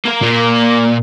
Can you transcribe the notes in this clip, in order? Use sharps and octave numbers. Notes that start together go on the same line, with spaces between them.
A#3 A#4
A#2